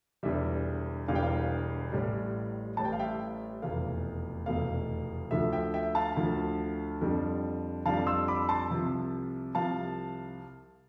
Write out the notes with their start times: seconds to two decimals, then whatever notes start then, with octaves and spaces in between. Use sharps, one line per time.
0.23 E1 E2 D3 G3 E5
1.08 E1 E2 D3 G3 F5
1.15 G5
1.23 F5
1.92 A1 A2 G3
2.77 A1 A2 G3 A5
2.85 G5
2.92 F5
2.99 E5 G5
3.62 F1 E2 B2 A3 F5
4.46 F1 E2 B2 A3 F5
5.31 D2 D3 F3 A3 E5
5.53 E5 G5
5.74 E5 G5
5.95 F5 A5
6.16 D2 D3 F3 A3
7.01 F2 D3 G3
7.86 F2 D3 G3 F5 A5
8.07 C6 E6
8.28 B5 D6
8.49 A5 C6
8.71 C2 C3 F3
9.55 C2 C3 F3 F5 A5